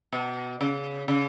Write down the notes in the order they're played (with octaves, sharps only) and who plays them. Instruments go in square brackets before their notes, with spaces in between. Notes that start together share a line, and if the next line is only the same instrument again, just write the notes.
[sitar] B2
C#3
C#3